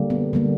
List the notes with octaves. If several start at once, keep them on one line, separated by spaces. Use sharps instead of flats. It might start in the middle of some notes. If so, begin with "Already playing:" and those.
Already playing: D3 G3 A#3
B3
D3 G3 A#3